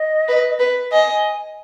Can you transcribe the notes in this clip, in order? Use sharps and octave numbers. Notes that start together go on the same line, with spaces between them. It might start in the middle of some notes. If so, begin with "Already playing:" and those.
Already playing: D#5
B4
B4
D#5 G#5